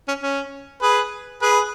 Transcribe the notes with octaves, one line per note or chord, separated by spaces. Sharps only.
C#4
C#4
G#4 B4
G#4 B4